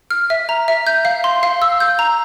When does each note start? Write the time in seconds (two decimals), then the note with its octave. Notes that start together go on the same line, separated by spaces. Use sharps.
0.11 F6
0.30 E5
0.49 A#5
0.68 E5
0.87 G6
1.05 F5
1.24 C6
1.43 F5
1.62 E6
1.80 G6
1.99 A#5